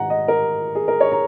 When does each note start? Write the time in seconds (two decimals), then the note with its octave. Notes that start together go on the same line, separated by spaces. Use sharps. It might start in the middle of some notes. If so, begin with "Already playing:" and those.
Already playing: G#1 G#2 F#5 A#5
0.10 D#5
0.28 A#4
0.75 G#4
0.88 A#4
1.00 C#5
1.12 A#5